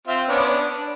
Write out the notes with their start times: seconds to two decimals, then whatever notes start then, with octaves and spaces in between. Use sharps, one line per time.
0.07 C4 F4 E5
0.29 B3 C#4 D4
0.68 D4